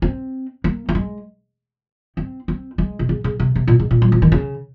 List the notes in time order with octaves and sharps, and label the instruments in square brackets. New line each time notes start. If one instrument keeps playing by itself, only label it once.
[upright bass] C4
A#3
A#3
G#3
C4
C4
G#3
C3
C#3
C#3
C3
C3
A#2
G#2
A#2
F#3
F3
D#3
C#3